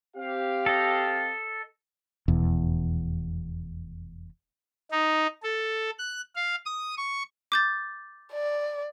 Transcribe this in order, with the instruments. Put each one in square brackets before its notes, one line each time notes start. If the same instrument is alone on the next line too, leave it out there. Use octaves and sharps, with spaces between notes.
[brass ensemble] C4 G4 F5
[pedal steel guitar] A4 D#5
[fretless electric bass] F1 E2 B2
[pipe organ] D#4
A4
F#6
F5
D#6
C#6
[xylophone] D6 G6 A6
[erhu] D5